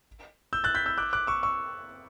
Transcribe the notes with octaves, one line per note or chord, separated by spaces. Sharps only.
E6 G6
F#6 A6
G6 B6
E6 G6
D6 F#6
D6 F#6
C#6 E6
C#6 E6